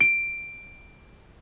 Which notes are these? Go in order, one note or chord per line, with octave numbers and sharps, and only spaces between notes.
D7